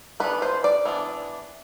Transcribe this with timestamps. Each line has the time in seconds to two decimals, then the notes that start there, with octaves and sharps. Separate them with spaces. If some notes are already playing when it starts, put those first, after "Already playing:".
0.20 E3 B3 D4 B4
0.42 C5
0.64 D5
0.86 E3 B3 D4